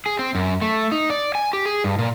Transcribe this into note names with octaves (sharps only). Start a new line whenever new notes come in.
G#4
C4
F#2
A3
D#4
D5
G#5
G4
G#4
G2
A#2